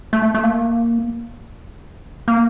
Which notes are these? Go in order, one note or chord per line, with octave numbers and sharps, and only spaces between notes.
A3
A3
A#3
A#3